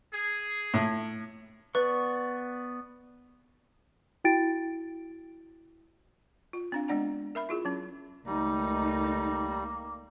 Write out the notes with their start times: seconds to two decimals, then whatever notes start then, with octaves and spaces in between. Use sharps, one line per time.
0.14 G#4
0.74 A2
1.75 B3 B4 D5 C#6
4.24 E4 F#4 G5 A6 D7
6.53 F4
6.72 C4 D4 F5
6.88 G#3 B3 D4 D5 F#5 A#5
7.35 A#4 E5 B5
7.49 E4 F4 G#4
7.65 F#3 C#4
8.27 C#2 D#3 G3 A3 A#3 D#4